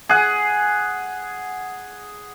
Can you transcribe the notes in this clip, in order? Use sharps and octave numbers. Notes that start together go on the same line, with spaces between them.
G#4 F#5